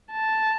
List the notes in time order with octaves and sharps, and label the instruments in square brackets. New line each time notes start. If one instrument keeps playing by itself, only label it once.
[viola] A5